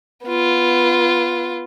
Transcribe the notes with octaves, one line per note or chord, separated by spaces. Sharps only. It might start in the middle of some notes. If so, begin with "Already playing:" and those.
B3 F4